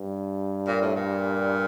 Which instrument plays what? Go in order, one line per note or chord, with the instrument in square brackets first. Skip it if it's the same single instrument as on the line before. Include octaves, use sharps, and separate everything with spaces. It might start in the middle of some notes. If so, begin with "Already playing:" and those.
Already playing: [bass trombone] G2
[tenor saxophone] A#2
A2
A#2